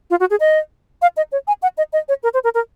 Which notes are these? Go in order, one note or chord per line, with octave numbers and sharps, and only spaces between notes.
F4
F#4
G#4
D#5
F5
D#5
C#5
G#5
F#5
D#5
D#5
C#5
A#4
C5
A#4
A#4